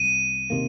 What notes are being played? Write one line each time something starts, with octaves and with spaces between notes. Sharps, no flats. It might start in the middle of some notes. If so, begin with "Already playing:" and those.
Already playing: C2 D#7
C3 D#3 A#3